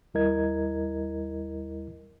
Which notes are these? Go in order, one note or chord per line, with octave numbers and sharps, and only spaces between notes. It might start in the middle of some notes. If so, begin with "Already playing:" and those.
D#2 G3 E4 A#4 D#5 G#6